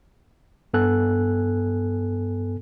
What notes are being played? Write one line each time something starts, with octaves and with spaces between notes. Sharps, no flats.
G2 B3 A4 G#5 F#6